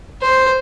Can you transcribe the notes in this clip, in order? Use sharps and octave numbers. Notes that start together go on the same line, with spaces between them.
C5